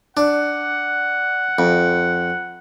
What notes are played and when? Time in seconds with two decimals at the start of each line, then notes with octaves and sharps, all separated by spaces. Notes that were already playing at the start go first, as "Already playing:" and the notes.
0.17 D4 F#5
1.59 F2